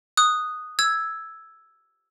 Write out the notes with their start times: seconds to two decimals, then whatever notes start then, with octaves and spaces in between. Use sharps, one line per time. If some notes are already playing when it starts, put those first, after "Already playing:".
0.17 D#6 F#6
0.79 E6 G#6